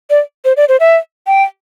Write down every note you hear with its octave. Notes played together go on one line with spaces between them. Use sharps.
D5
C5
D5
C5
E5
G5